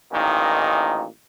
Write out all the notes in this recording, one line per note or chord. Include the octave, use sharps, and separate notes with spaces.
A1 A#2 D#3 D#4